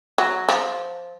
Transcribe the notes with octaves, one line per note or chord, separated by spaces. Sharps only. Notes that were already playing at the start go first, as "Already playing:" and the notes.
F#3
F3